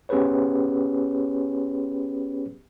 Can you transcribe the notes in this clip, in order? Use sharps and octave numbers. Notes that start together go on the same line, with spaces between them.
B3 C#4 G4 G#4 B4 C#5